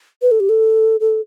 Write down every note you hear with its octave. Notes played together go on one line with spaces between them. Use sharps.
B4
A4
G4
A4
A4